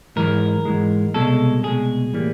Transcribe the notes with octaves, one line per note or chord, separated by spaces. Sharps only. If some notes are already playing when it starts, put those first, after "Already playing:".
G#2 E3 G#3 A#4
G#2 E3 G#3
C2 B2 G#3 A4
C2 B2 G#3 G#4
A2 E3 G3 A#3